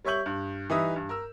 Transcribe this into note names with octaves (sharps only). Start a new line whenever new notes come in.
G3 C#5 E5 C#6 G6 F#7
G2
E3 G3 D#4 B4 E5 D#6
G2
A#4 E6